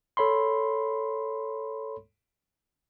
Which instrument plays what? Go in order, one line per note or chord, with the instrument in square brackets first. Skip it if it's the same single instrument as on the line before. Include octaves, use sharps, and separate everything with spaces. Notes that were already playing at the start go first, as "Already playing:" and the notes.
[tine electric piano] A4 C#5 B5 C6